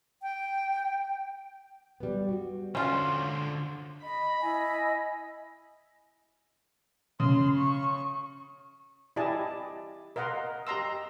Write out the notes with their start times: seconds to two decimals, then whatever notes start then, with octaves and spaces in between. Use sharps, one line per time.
0.22 G5
2.00 G3 B3
2.29 F#4
2.75 D3 C#4 F4 C5
4.03 D#5 B5
4.42 E4 D#5 G#5
7.20 C#3 C6
7.57 C#6
9.16 E4 G4 D5 D#5 G#5 A5
10.16 A#4 D#5 F5 F#5 A#5 C6
10.67 G4 D#5 A#5 C6 E6